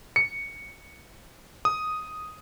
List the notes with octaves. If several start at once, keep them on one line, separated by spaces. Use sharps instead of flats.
C#7
D#6